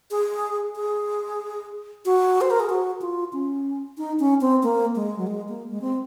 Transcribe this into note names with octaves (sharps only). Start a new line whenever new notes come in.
G#4
G#4
F#4
C5
A#4
G#4
F#4
F4
C#4
D#4
C#4
C4
A#3
G#3
F#3
G#3
A#3
G#3
C4